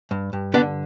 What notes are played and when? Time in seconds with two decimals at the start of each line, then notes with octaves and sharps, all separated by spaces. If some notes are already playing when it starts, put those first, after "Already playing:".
0.11 G2
0.33 G2
0.54 D3 B3 D4